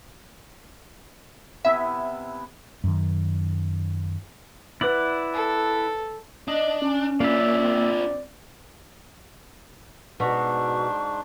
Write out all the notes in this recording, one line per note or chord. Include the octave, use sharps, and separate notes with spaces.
C3 B3 E4 E5
F#2 D#3
E4 B4 D5 F#5 F#7
A4
D4 D#5
C#4
A#3 D4 F4 D5 E5
C4
G#2 B2 D4 F#4 C#6